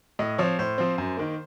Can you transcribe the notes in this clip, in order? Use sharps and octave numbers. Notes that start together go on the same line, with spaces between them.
A2 D#5
F3 C4 C#5
A2 C5
F3 C4
F#2
D#3 A#3